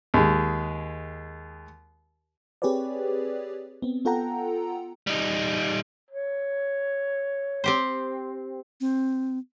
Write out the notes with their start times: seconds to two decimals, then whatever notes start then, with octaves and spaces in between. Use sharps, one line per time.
0.14 D#2 G#3
2.62 C4 G4 G#4 B4 C#5 D5
3.82 B3 C4
4.05 B3 F4 A4 F#5 G5 A#5
5.07 G3 D#4
6.11 C#5
7.64 C4 G4 C5
8.81 C4